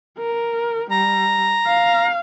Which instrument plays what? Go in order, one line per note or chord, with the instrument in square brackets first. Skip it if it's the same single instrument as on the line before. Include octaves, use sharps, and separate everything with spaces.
[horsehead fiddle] A#4
[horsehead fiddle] G3 [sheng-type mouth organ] A#5
[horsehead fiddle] F5